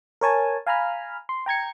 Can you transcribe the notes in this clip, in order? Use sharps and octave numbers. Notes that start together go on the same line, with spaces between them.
A#4 C#5 G#5 A5
F5 G#5 A#5 B5 F6
C6
G5 A#5 G#6 C#7